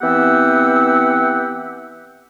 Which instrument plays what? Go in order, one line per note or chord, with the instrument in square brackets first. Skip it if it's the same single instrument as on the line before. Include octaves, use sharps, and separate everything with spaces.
[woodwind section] E3 B3 C4 G4 F#5 E6